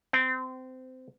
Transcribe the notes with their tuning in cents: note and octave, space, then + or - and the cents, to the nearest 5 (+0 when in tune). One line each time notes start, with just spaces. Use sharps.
C4 -25